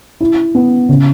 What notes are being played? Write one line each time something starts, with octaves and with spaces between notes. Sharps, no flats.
E4
B3
C#3